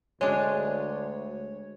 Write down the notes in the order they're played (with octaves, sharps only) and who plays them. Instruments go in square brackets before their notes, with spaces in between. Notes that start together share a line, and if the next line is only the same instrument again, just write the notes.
[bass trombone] D2 [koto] G#3 D4 [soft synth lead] C#5